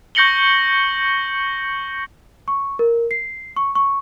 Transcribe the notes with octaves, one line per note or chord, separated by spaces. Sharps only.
C#6 G6 A#6 C#7 F#7 G7
C#6
A#4
C7
C#6
C#6